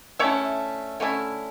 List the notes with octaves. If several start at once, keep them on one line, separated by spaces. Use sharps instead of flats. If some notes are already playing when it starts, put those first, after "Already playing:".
D3 A3 C#4 E4 C#5 E5
D3 A3 C#4 E4